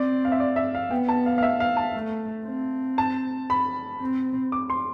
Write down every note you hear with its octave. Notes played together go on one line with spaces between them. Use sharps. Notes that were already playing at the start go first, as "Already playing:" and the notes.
Already playing: C4 D5
F5
E5
D5
E5
F5
B3 G5
A5
F5
F5
E5
F5
A5
A3
C4
A5
B5
C4
D6
C6